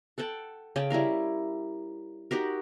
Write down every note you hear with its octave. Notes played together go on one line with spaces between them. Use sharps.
A4 F#5 G5 A5
C#3 C#4 G5 A5
G3 E4 A#4 F5
D#4 F#4 G4 A#4